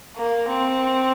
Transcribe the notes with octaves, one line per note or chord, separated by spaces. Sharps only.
A#3
C4